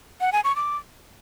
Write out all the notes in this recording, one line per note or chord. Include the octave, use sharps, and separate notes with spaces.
F#5
G#5
C#6
D6